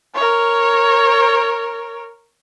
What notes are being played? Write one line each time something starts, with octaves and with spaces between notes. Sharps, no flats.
A#4 C#5